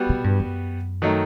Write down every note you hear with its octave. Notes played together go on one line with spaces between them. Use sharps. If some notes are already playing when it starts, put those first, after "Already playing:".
Already playing: G3 B3 F#4
B2
G2
F#2
D#3 F#3 A3 D#4